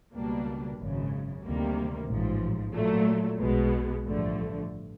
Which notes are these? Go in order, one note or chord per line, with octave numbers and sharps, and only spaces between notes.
C#2 B2 G3 A#3 D4
G#1 F#2 C#3
D2 C3 D#3 G3 A#3
A1 G#2 F3
A#2 F#3 A3
B1 B2 G#3 B3
A1 G2 D3 F3 A3